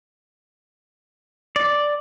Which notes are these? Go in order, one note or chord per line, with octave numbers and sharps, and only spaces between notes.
D5